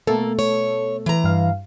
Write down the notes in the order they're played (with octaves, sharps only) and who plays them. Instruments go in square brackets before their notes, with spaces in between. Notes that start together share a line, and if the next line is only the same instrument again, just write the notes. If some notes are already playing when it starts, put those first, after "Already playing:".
[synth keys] B2 A3 A4 [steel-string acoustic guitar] A#3
[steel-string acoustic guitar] C#5
E3 A#5
[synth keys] G2 F5